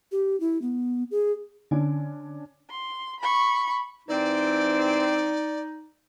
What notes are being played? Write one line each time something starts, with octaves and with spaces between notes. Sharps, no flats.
G4
E4
B3
G#4
D3 C#4 D4
C6
B5 C#6
G#2 E3 C4 D#4 D5